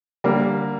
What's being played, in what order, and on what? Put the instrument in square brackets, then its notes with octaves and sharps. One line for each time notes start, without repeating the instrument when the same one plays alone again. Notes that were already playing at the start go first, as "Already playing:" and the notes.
[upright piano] D3 G3 A#3